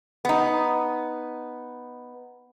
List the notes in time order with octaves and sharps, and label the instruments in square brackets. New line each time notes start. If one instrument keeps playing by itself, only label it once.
[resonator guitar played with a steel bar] B3 D#4